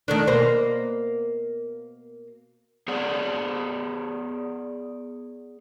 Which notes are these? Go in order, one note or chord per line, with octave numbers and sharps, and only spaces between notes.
D#3 A3 D4
B2 A#3 C5
B3 G#4 C#5 D5 F#5